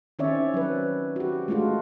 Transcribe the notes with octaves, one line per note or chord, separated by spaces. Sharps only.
D#3 C4 C#4 C#5 D5 E5
F#3 B4
F#4 G4
G#3 A3 D4 F4 F#4